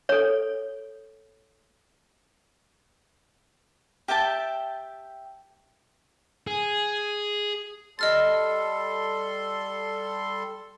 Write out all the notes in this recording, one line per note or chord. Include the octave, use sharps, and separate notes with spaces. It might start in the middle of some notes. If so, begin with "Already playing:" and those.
A4 C#5
G4 E5 G5 A5
G#4
G3 A4 D#5 C6 F6 A6